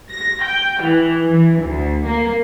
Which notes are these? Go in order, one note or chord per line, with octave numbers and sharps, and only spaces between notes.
A#6
G5
E3
E3
D2
A#3